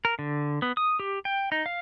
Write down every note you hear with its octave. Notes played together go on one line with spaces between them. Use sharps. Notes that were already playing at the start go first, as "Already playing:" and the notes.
A#4
D3
B3
D#6
G4
G5
D#4
F5